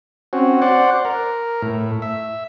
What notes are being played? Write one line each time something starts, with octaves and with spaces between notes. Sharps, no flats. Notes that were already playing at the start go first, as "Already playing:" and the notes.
C4 C#4 F#4
C5 D5 F#5
A#4
A2
E5